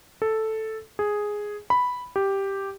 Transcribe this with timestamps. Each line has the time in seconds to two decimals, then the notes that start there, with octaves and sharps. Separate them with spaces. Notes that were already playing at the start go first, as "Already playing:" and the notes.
0.22 A4
0.99 G#4
1.70 B5
2.16 G4